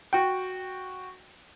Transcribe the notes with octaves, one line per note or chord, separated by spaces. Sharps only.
F#4 G5